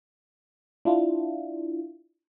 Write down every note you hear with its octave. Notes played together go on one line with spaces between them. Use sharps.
D4 E4 F4